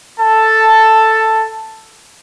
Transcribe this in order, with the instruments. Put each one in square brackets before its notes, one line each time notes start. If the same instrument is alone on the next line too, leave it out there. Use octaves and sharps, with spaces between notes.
[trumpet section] A4 A5